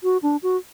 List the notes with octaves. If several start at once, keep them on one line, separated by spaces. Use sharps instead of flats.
F#4
D4
F#4